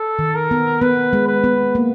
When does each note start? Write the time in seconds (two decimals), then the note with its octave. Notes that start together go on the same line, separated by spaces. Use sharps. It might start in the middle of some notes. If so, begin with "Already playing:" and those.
Already playing: A4
0.19 D#3
0.35 A#4
0.51 B3
0.81 B3 B4
1.13 G#3
1.28 B4
1.44 B3
1.75 A#3